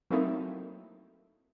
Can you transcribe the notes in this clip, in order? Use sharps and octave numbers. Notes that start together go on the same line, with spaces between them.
F#3 A3 A#3 C4 D#4 E4